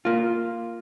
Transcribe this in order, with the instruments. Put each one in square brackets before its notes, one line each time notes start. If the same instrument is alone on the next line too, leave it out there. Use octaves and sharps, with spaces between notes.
[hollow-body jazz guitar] A#3 F4